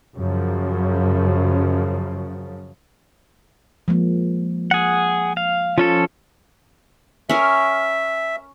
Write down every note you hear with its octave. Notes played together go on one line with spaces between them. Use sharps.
F#2 C#3 F3
F3 G#3 A#3
G#4 F#5
F5
F3 C#4 F4 A4
C#4 A#4 E5